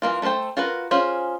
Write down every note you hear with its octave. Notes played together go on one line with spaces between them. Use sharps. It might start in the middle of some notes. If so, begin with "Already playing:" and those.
E3 A3 A#3 F4
A3 A4 A#4 C5 G5
F4 F#4 A#4 B4
C#4 F4 G#4 C5